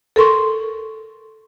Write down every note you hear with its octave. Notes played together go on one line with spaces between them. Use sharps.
A4 A#4 C6 C#6